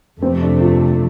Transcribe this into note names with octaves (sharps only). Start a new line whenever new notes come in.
F2 C3 A3 C4
D4
F4